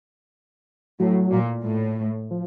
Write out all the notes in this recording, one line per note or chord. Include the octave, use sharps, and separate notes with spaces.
A2 F#3
A#2
A2
F3